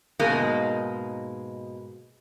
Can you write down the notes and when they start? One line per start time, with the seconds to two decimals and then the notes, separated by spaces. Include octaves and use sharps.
0.19 G#2 B2 G#3 A#3 D#4